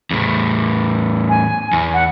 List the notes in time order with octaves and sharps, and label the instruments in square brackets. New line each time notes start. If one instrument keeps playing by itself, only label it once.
[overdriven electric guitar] E2 A2
[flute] G#5
[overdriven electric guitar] E2
[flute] F#5